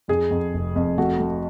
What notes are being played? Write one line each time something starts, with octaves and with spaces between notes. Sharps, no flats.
F2 G#4
F2
F1
F2
A3 F#4
A3